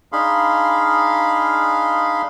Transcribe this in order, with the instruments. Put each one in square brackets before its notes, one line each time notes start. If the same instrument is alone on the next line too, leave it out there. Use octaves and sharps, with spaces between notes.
[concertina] D4 D#4 G#4 F5 B5 C6